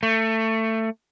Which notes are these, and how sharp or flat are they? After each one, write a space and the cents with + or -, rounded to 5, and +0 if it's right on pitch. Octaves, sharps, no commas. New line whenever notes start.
A3 +20